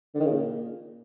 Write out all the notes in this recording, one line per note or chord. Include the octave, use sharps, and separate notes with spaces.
D3
D#3
C#3
A#2